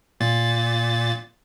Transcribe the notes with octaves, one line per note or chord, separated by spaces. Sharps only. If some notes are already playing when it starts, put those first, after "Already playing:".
A#2 A6